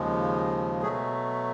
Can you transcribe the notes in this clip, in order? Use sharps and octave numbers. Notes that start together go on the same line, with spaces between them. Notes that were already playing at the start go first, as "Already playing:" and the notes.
Already playing: D#2 C#3 F3 G#3
B2 F#3 A3 G#4